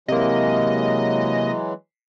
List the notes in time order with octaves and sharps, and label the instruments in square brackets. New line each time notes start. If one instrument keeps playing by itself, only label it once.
[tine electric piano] C3 A#3 [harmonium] E3 F#3 G#3 [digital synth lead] D#5